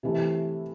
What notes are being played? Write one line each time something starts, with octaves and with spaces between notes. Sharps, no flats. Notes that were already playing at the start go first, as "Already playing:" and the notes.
C3 E3 A3